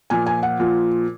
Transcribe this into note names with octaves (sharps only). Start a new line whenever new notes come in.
A#2 F3 G#5
G#5
F#5
A#2 F3